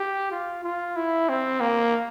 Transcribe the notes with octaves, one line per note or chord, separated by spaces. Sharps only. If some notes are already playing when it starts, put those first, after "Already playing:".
Already playing: G4
F4
F4
E4
C4
A#3